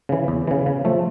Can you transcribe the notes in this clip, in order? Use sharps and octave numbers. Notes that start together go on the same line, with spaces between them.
C#3 E3
E2
C#3 E3
C#3
F3 A3